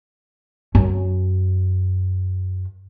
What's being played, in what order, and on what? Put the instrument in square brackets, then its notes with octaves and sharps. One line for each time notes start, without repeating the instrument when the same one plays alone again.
[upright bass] F#2 C#4